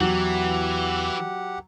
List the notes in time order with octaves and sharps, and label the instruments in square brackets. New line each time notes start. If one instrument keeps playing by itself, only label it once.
[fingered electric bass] E2 [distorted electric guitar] E3 [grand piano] F#3 [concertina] G4 F#5